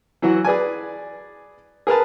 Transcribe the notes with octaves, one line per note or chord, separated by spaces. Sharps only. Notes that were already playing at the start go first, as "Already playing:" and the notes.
E3 F#3 E4 F#4
G#4 B4 D5 G#5
G#4 A#4 B4 A5